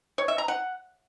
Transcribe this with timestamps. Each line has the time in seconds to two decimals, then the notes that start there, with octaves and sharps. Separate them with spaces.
0.18 C#5
0.28 E5
0.38 A#5
0.48 F#5